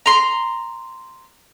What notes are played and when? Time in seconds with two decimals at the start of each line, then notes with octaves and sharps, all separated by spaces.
0.06 A#5 C6